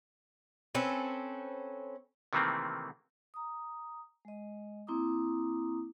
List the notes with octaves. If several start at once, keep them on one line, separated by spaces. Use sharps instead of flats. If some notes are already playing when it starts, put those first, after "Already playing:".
C4 C#4 A4 B4
C3 D#3 E3 A3 A#3 C4
A#5 D#6
G#3 D#5
A#3 C4 E4 A#5 D6 D#6